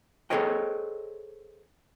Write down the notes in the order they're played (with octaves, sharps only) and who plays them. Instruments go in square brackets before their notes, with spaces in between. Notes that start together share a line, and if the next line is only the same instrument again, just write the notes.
[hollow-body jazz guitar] G#4 A4 C5 C#5 D#5 G5